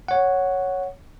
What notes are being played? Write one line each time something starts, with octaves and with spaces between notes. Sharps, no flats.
C#5 F#5